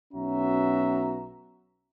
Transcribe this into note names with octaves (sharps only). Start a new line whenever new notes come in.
B1 B3 C#4 F#4 E5 A#5